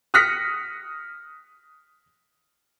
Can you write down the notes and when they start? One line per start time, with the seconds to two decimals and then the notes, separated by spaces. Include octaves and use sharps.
0.14 D#6 F6 F#6 A#6 B6 C#7